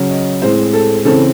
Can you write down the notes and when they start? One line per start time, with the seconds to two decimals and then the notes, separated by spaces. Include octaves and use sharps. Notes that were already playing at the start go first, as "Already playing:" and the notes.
Already playing: C#3 F#3 C#4
0.10 D#5
0.42 A2 G#3 C4 C5
0.73 A4
1.05 C#3 E3 C4 A4